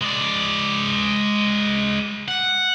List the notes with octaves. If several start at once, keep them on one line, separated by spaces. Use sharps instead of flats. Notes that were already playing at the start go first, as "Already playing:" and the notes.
G#3 D5
F#5